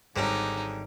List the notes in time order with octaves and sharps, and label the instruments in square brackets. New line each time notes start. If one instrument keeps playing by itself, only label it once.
[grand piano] G#1 C#5 [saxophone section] G#2 [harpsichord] D3 G3 [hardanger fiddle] D#4